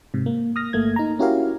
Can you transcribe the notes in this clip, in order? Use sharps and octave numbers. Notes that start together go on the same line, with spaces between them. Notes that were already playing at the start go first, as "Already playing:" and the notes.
G#2 C3
A#3
D#6 F6 A#6
G1 A3 A#3 G#6
D#4 A#5
C#4 E4 F#4 G4 A#4 F5